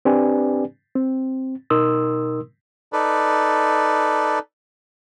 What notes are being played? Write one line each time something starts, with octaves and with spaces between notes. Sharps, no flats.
C4 D4 G4 B4 D5 G#5
C4
B2 D#4 A#4 C6 D#6 E6
D#4 A4 B4 D5